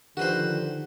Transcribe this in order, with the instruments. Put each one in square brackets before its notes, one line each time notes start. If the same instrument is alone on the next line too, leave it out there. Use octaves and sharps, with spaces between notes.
[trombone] D3 [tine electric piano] D#3 F3 [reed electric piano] D#4 G4 [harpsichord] F#4 B4 C5